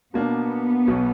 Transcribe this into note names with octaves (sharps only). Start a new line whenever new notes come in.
B2 A#3 B3 D4
B1 B2 F#3